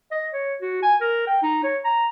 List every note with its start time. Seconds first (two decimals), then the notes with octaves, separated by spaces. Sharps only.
0.11 D#5
0.33 C#5
0.61 F#4
0.83 G#5
1.01 A#4
1.27 G5
1.43 D#4
1.64 C#5
1.85 A#5